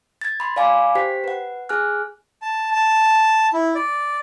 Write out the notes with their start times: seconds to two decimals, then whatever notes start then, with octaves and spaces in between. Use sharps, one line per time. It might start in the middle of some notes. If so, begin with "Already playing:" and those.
0.21 G#6 A6
0.40 B5 C6
0.56 D5 F5 G#5 B5 D6
0.95 G4 C5 G5 B6
1.24 B4 F#5
1.69 G#4 G#5 F6 F#6
2.42 A5
2.72 A5
3.53 E4
3.75 D5